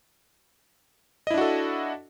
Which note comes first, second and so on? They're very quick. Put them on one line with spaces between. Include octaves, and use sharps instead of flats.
D#5 E4 D4 F#4 A4